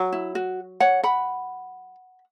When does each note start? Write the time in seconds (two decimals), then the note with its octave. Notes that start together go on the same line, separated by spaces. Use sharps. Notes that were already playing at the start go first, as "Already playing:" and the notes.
Already playing: F#3
0.13 E4
0.35 F#4
0.80 C#5 F#5
1.03 F#5 B5